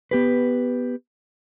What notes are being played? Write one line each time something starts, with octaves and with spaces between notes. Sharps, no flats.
B3 G4 B4